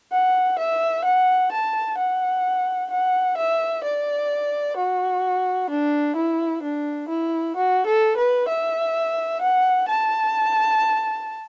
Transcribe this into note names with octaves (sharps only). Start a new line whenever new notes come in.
F#5
E5
F#5
A5
F#5
F#5
E5
D5
F#4
D4
E4
D4
E4
F#4
A4
B4
E5
F#5
A5